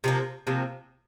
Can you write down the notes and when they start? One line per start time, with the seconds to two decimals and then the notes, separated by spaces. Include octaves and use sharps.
0.04 C3 F3 A#3
0.47 C3 F3 A#3